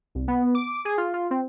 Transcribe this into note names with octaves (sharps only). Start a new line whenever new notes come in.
C2
B3
D6
G#4
F4
F4
C4